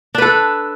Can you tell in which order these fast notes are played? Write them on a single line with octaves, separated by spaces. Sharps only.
D4 B4 A4